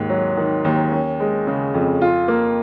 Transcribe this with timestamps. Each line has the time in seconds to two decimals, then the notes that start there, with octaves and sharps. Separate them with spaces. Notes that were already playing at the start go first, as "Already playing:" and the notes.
Already playing: D#2 G#2
0.09 F#3
0.37 D#3
0.65 D#2
0.92 C#4
1.20 G#3
1.47 C#3
1.74 F2
2.01 F4
2.28 A#3